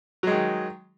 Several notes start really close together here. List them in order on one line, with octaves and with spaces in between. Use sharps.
F#3 G#3 D#3